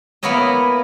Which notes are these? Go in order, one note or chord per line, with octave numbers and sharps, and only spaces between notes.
A#3 B3 E4 A#4 C#5 D#5